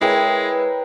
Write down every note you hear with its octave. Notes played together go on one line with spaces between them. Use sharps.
G#3 E4 G#4 A#4 B4 C#5 G5